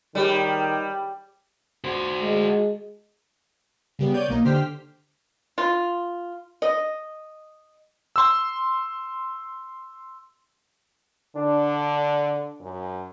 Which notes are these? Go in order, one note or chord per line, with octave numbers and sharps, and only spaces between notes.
D#3 G3 G4 G#4 C#5
F#4 C5
G#3
C#3 G3 B3
C#5 D5 G6 D#7
B1 A#3 D#4
D3 G4 C5 F6 B6
F4
D#5
C6 E6
D3 D4
F#2